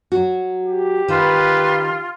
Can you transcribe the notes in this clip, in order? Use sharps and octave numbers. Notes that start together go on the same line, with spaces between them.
F#3 F#4
G4
D#3 F4 B4